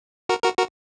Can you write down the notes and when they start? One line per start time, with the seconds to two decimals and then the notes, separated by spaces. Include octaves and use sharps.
0.29 F#4 A#4
0.43 F#4 A#4
0.58 F#4 A#4